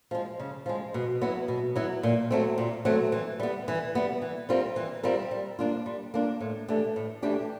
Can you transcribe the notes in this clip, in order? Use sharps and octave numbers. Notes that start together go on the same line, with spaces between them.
F3 G#3
C#3
F3 G#3
B2
F#3 B3 E4
B2
F#3 B3 E4
A#2
F#3 A3 C4
A#2
F#3 A3 C4
E3
G3 B3
E3
G3 B3
E3
G3 C4 F4 A#4
E3
G3 C4 F4 A#4
G3
A#3 D4 F4
G3
A#3 D4 F4
A2
E3 A3 D4 G4
A2
E3 A3 D4 G4